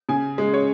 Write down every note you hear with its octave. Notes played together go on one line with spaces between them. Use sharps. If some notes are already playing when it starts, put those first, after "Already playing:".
C#3 G#5
G#3
C#5